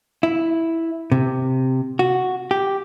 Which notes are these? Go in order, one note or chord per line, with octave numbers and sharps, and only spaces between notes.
E4
C3
F#4
G4